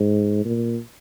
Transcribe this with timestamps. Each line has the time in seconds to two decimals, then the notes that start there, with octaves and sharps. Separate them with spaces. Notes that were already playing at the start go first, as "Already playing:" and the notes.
Already playing: G#2
0.45 A#2